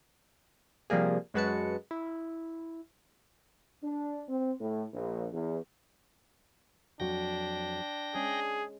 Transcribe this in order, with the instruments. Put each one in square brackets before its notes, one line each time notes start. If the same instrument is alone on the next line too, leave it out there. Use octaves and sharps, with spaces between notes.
[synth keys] C3 F3 G3 A#3 G#4
F#2 G#3 F#4 B4 A5 C#7
E4
[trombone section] D4
C4
A2
A#1
E2
[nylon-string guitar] F2 F#3 F#4 [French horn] D4 [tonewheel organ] G5 A#6
[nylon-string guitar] G#3 C#4 [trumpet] G#4